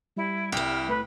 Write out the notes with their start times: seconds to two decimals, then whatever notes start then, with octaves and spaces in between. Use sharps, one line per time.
0.16 G3 E4
0.52 C2 E4 G5 F6
0.88 A2 B4